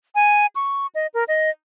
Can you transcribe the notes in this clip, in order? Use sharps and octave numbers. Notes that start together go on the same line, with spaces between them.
G#5
C#6
D#5
A#4
D#5